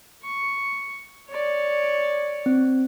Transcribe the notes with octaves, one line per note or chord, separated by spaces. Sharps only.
C#6
C#5 D5
C4